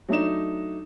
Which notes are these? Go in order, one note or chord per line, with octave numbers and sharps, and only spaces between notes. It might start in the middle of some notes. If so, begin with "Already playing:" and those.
F#3 A3 D4 D#4 E7